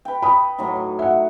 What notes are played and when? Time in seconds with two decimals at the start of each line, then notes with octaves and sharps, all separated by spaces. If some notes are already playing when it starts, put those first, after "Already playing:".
0.05 B4 G5
0.22 B5 D#6
0.58 A2 F#3 D#4
0.99 E5 F#5